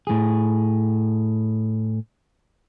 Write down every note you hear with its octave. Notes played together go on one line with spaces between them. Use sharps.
A2 G#4